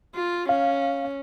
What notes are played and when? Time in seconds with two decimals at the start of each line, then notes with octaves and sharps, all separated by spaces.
0.15 F4
0.49 C#4 F5